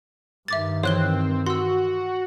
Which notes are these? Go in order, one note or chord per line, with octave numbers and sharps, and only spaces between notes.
G2 D#3 E5 D6 A6
E3 C4 C#5 F#6 G7
F#4 C6 E6